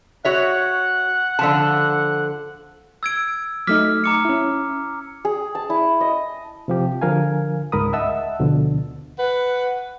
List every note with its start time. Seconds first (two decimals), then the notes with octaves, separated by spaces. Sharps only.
0.25 F#4 C#5 E5 F#5
1.39 D3 F3 A5
3.03 E6 G#6 D7
3.67 F#3 A3 D#4 D6 F6 B6
4.04 A#5 D6 C#7
4.25 C#4 E4
5.25 G#4
5.55 A5
5.70 E4
6.01 D#5
6.68 C3 F3 G4
7.02 D3 F3 A#4 F5 G#5
7.72 C#2 G#2 A#4 B5 D#6
7.93 D#5 E5 F#5 A5 E6
8.39 D2 B2 D3 F3
9.19 B4 F#5